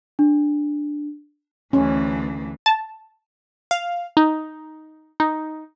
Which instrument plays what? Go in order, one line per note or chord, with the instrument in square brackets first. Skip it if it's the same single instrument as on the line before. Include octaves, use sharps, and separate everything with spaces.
[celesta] D4
[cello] D2 E3 [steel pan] C#4
[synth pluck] A5
[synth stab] F5
D#4
D#4